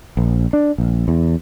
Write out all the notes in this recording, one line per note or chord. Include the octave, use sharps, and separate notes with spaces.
A#1
D4
A#1
E2